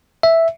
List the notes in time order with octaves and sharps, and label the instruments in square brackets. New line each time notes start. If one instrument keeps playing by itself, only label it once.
[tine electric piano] E5